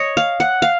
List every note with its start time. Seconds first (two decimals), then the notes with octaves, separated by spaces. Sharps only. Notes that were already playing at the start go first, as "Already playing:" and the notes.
Already playing: C#5 D#5
0.17 F5
0.40 F#5
0.62 F5